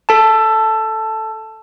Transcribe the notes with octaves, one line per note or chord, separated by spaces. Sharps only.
A4 A5